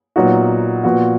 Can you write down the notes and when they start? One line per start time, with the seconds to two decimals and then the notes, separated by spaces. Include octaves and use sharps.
0.16 A#2 F#3 B3 D#4 F#4
0.84 A#2 F3 B3 F#4